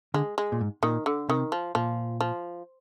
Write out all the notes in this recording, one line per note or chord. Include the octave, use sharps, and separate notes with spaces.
D3 G#3
G#3
A#2
G#2
A#2 D#3
D3
C3 D#3
F3
A#2 F3
F3